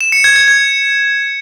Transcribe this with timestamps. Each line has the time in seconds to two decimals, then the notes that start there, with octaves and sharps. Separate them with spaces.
0.01 E7
0.12 C#7
0.24 G#6
0.36 G#6
0.48 G#6